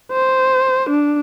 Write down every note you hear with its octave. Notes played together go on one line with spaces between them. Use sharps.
C5
D4